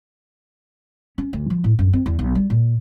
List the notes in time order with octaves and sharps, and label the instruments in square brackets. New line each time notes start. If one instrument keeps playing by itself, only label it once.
[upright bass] C#4
D2
F3
A2
F#2
C4
E2
B1
G3
A#2